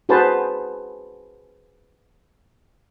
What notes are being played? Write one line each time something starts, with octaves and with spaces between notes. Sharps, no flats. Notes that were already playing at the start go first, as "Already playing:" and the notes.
F#4 G#4 B4 C5 A5